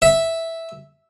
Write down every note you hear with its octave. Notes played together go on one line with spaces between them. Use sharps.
E5